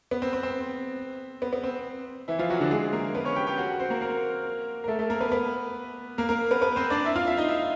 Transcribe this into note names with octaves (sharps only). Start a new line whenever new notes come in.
B3
C4
C4
C4
B3
B3
C4
E3 E4
F3 F4
F#3 F#4
D3 D4
G#3 G#4
A#3 A#4
B3 B4
C#4 C#5
G4 G5
G4 G5
F#4 F#5
C4 C5
A#3 A#4
A#3 A#4
A#4
A3 A4
A3 A4
A#3 A#4
B3 B4
B3 B4
A#3 A#4
A#3 A#4
B3 B4
B3 B4
C4 C5
D4 D5
E4 E5
F4 F5
E4 E5
D#4 D#5
E4 E5